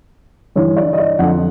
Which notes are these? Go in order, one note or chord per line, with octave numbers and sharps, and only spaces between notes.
G2 E3 C#5
D5
D#5
D5
F2 D3 F3 F#5